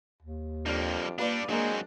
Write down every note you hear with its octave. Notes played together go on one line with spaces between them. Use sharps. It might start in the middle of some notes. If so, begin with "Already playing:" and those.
D#2
F2 G3 A#3 D4 F6
G3 A#3 D4 F4 B4 D5
F#3 G#3 A#3 C4 D4 A#4